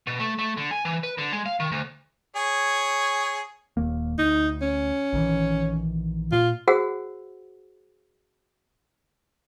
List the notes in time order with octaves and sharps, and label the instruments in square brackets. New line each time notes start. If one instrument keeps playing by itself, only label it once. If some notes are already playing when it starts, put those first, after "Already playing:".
[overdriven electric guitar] B2
A3
A3
D3
G#5
E3
B4
D3
G#3
F5
D#3
D2
[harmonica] G#4 C#5
[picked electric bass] D#1 D#2 A#3
[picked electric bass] D2 [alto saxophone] D#4
[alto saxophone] C#4
[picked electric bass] A#1 D#3 E3
[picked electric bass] A#2 [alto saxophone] F4
[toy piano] F#4 G#4 C5 F#5 E6